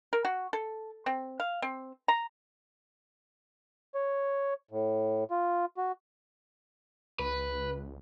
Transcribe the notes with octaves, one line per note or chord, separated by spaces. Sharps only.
A#4
F#4
A4
C4
F5
C4
A#5
C#5
A2
F4
F#4
C#2 B4